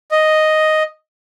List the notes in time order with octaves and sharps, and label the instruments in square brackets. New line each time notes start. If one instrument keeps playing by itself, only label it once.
[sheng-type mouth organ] D#5